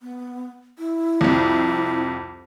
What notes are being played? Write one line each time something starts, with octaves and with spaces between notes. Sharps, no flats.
B3
E4
C2 F2